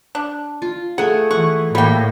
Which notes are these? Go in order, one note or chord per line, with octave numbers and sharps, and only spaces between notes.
D4
F4
A3 G#4 F#5
E3 F#5 C#6
A2 G3 A#3 G5